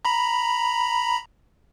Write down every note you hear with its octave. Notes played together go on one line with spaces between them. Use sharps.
A#5 B5